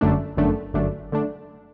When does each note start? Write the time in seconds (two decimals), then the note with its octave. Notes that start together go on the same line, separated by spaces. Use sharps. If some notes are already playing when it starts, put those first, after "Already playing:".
0.01 G1 F#2 D3 A3 D4
0.37 G1 F#2 D3 A3 D4
0.74 G1 F#2 D3 A3 D4
1.12 D3 A3 D4